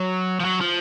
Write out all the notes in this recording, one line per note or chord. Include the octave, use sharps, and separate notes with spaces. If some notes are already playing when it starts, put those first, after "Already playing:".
Already playing: F#3
F3
F#3
F3